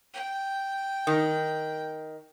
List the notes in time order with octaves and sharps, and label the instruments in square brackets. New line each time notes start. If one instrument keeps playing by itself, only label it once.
[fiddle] G5
[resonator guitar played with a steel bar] D#3